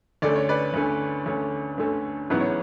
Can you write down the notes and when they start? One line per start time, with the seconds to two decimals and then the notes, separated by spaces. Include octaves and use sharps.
0.22 D2 D3 A3 C#4 D5
0.36 C#5
0.49 B4 D5
0.74 D2 D3 A3 C#4
1.26 D2 D3 A3 C#4
1.78 D2 D3 A3 C#4
2.30 A1 G#2 F#3 B3 E4 B4
2.40 C#5